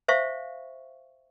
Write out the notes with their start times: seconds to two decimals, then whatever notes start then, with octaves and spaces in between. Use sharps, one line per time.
0.08 C5 E5 F5 C#6